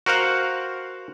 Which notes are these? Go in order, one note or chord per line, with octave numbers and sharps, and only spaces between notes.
F#4 A#4 C5 F5 F#5